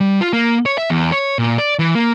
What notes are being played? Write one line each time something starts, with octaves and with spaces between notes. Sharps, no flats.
G3
F4
A#3
C#5
E5
E2
C#5
A#2
D5
E3
A#3